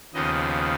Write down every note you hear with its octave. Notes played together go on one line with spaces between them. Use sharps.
D#2 C#3 F3 B3 D#5